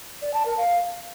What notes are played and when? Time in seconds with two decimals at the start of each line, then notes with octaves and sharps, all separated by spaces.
0.22 D5
0.34 A5
0.46 A#4
0.57 F5